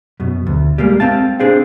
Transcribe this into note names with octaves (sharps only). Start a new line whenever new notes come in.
F#2 B2
D2
G3 G#3 A#3
C4 F5 A5
C4 D4 G#4 C5 F5